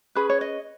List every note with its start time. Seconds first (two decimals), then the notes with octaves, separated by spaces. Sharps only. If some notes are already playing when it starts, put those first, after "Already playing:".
0.15 C#4 G#4 B4 B5
0.30 C#5
0.41 D#5